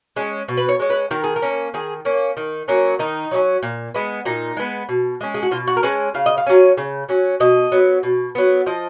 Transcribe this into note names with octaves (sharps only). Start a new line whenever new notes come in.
G#3 C#4
B2
B4
C#5
G#3 C#4
B4
D#3 A#4
G#4
A#4
A#3 C#4
D#3 G#4
A#3 C#4
D#3
F#3 A#3 C#4
D#3 D#4
F#3 A#3 C#4
A#2
G#3 B3
A#2 D#4
G#3 B3
B2
G#3 C#4
G#4
F#4
B2 F4
F#4
A#4
G#3 C#4 B4
C#3 F5
D#5
F5
F#3 C#4
C#3
F#3 C#4
B2 D#5
F#3 B3
B2
F#3 B3
F3 D#5